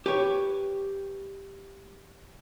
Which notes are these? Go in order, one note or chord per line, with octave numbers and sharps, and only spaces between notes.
G4 B4 C#5